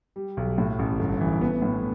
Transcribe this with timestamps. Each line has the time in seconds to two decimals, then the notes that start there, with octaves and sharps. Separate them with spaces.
0.16 G3
0.37 B1
0.58 A2
0.79 A1
0.99 G1
1.21 E3
1.41 B3
1.62 A2